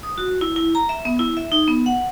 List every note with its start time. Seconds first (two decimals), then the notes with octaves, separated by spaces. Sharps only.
0.03 D#6
0.18 F#4
0.41 E4
0.56 E4
0.75 A#5
0.89 E5
1.05 B3
1.19 E4
1.37 E5
1.52 D#4
1.68 B3
1.86 F#5